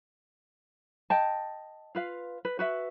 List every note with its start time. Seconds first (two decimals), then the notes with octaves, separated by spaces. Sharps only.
1.10 D#5 G5 A5
1.95 F4 B4 F5
2.45 B4
2.59 F#4 B4 E5